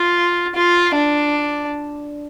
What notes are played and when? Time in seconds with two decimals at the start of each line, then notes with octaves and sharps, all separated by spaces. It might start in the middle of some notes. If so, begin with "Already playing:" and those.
Already playing: F4
0.55 F4
0.95 D4